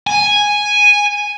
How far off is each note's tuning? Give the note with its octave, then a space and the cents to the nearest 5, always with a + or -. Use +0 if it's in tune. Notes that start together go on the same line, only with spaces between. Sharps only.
G#5 -5